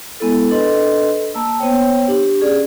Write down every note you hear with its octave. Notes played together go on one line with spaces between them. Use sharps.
G#3 B3 E4 A4
D4 A4 B4 D#5 C6
A#3 A5 E6
B3 C5 C#5 G5
D4 G4
C#4 G#4 D5